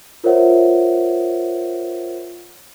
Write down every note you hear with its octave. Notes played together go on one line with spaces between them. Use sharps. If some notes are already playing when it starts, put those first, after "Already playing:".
F4 A#4 C5 C#5 E5 F#5